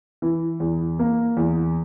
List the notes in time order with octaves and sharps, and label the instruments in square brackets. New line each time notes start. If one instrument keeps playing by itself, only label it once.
[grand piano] E3
E2
A#3
E2